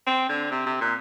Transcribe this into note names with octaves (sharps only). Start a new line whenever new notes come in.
C4
D3
C3
C3
A#2